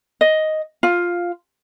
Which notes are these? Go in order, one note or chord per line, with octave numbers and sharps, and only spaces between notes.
D#5
F4